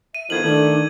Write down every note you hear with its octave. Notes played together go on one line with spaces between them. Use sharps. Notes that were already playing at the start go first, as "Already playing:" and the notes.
E5 D#7
B2 D#3 F3 E4 A4 G#6 F#7
D#3 A3 D4